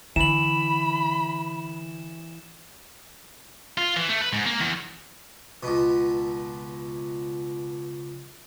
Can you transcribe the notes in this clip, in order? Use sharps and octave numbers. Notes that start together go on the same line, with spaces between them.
D3 E3 B5 E7 F#7
F4
E3
A3
B4
G#2
A#3
E2
C#2 B2